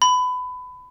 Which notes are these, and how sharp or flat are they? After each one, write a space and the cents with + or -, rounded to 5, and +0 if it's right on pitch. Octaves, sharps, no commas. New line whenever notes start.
B5 +25